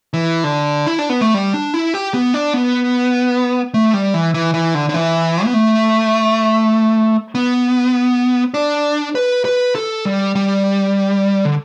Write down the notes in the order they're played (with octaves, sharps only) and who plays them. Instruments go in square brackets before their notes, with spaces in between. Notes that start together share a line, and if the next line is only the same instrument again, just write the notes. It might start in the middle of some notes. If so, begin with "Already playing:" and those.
[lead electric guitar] E3
D3
E4
D4
B3
A3
G3
D4
E4
G4
B3
D4
B3
A3
G3
E3
E3
E3
D3
D3
E3
B3
A3
B3
D4
B4
B4
A4
G3
G3
D3